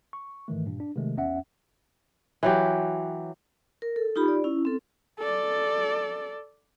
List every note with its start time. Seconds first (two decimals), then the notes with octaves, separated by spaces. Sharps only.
0.13 C#6
0.48 G#2 D#3 E3 A3
0.66 G2 A#2
0.80 D4
0.96 C3 D#3 G#3 A3
1.16 A#1 E2 C#4 E5 F#5
2.43 E3 F#3 G4
3.82 A#4
3.96 A4
4.16 D#4 F4 G4 B5
4.28 D5
4.44 C#4 E4
4.65 C4 A4
5.19 A4 D5